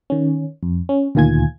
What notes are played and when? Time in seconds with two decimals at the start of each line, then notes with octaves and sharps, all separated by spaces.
0.10 D#3 C#4
0.63 F2
0.89 C#4
1.15 D2 A#2 D#3 F4 G#5 G#6